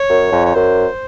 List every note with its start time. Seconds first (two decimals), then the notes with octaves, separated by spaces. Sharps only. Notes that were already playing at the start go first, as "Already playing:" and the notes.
Already playing: C#5
0.10 F#2
0.32 F2
0.45 C#5
0.55 F#2 C5